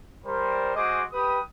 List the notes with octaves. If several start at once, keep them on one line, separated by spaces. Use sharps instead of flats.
G3 A#4 C5
G#3 F#4 G#4 C5 D#5 D6
G4 B4 D#6